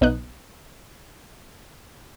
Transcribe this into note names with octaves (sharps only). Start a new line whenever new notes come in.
B1 B3 D#4 D#6 F#6